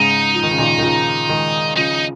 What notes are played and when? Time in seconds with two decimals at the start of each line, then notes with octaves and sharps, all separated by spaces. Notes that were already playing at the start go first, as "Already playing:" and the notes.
Already playing: G#2 C#3 D#4
0.35 F3
0.43 D#3
0.51 C#3
0.58 A#2 D#3
0.78 D#3
0.82 C#3 F3
1.29 D#3 G#3
1.76 C#3 F3 D#4